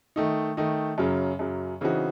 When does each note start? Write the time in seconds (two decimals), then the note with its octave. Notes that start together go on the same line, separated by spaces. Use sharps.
0.16 D#3 A3 D#4
0.57 D#3 A3 D#4
0.98 F#2 C#3 F#3
1.39 F#2 C#3 F#3
1.81 C#3 E3 C4 D#4 F#4